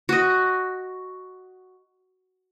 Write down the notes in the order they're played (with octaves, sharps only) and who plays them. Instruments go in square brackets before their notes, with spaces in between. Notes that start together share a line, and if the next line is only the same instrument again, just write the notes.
[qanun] F#4 D#5